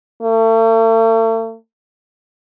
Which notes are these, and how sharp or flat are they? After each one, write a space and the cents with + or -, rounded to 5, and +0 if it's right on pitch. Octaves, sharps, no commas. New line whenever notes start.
A3 +45